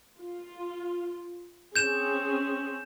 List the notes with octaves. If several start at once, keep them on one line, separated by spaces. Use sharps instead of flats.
F4
C4 C#4 G#4 G6 E7